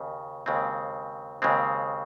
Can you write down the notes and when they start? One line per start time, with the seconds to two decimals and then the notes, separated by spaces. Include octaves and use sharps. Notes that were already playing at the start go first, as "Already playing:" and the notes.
Already playing: D#2 C#3
0.46 D#2 C#3 G#3 C4
1.42 D#2 C#3 G#3 C4